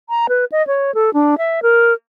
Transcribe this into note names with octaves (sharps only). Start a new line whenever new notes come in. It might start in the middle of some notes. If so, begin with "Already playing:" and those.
A#5
B4
D#5
C#5
A4
D4
E5
A#4